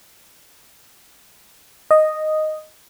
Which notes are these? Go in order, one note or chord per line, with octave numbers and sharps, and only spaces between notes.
D#5